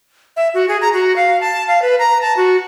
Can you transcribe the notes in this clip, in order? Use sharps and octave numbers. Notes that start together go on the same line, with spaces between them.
E5
F#4
G#4
A#5
F#4
F5
A5
F5
B4
A#5
A5
F#4